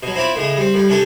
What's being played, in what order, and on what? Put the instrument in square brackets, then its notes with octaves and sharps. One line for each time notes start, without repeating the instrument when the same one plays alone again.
[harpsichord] B2 F#3
C4 E4 F4 D5 B5
A2 C#3 G#3
G3 C4
A2 G3
C3 C#4 D4 G4 A4